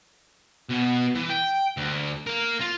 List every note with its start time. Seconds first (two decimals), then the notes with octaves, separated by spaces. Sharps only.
0.70 B2 B3
1.15 E3
1.30 G5
1.77 D2
2.27 A#4 F5
2.61 F4